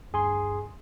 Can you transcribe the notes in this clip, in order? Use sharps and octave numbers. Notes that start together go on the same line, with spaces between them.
D2 G2 G#4 G#5 C6